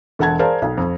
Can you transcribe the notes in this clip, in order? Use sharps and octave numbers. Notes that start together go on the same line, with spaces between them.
E1 A4 F#5 A5 G#6
G#4 A#4 C5 D5 F5 A5
B1
F2